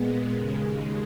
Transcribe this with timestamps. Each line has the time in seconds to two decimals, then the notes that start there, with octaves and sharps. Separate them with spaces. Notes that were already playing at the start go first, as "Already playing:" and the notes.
Already playing: A#2 G#3 B3
0.33 D#2 C#3 G#3